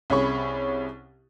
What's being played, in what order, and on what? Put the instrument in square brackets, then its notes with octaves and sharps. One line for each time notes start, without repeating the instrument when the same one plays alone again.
[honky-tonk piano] C2 C3 C#4 G#4 B5 C#6